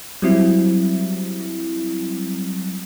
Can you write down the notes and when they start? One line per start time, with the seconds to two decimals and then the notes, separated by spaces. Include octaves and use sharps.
0.22 F#3 G3 C4 E4